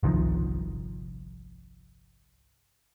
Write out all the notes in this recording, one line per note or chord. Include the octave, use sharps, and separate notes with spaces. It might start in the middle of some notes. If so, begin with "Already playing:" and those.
G1 C2 D#3 F3